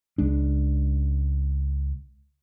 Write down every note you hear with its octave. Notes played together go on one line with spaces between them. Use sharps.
C#2 G#3 D4